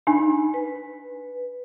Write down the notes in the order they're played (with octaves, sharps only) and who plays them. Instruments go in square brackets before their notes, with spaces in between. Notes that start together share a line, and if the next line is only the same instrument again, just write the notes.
[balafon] D4 D#4 G#5
[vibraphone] B4